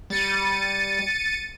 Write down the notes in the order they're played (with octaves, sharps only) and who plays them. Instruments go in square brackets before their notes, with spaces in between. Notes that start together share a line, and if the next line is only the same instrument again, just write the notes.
[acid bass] G3 [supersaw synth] A6 C#7 D#7